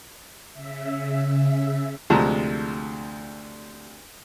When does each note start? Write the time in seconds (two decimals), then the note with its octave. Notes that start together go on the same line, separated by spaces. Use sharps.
0.53 C#3 E5
2.10 D2 C3 F3 G#3 A5 A#5